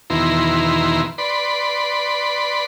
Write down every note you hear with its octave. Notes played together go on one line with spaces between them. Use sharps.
E2 B2 D#3 E4 A#5 C6
B4 D5 B5 C6